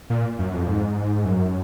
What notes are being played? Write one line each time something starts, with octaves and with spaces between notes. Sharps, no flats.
A#2
F#2
F2
G#2
F#2